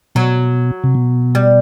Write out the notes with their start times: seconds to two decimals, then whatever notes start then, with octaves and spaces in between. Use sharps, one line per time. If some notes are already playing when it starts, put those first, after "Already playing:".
0.15 B2 F#3
0.84 C3
0.95 B2
1.35 G3